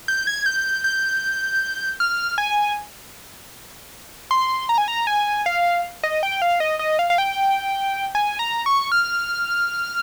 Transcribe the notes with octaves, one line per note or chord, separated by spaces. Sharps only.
G6
G#6
G6
G6
F6
G#5
C6
A#5
G#5
A#5
G#5
F5
D#5
G5
F5
D#5
D#5
F5
F5
G5
G#5
A#5
C#6
F6